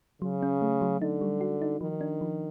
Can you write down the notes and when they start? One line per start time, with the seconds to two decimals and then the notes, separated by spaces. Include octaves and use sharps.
0.22 C#3 F#3
0.43 C#4
0.62 A3
0.81 F#3
1.01 D3 D#4
1.21 G3
1.41 F#4
1.62 D#4
1.81 D#3 F3
2.01 D4
2.21 F3